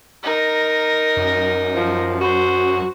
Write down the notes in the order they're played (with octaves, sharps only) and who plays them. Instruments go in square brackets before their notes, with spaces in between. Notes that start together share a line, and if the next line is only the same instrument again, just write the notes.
[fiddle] D#4 A#4
[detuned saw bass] F#2
[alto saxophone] F3
[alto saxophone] F#4 [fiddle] C5